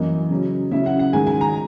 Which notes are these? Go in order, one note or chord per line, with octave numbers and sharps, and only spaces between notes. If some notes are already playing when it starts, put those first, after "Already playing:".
Already playing: F#2 E3 A#3 D#5
C#3 F#3 C#4
C#3 F#3 C#4 E4 E5
F#5
F#5
G#2 D#3 G#3 G#5
G#5
A#5